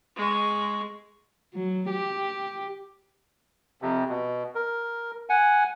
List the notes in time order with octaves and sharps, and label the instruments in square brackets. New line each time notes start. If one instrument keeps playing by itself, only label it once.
[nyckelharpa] G#3 C#6
[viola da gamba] F#3
G4
[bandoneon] F2 C3
B2
A#4
F#5 G#5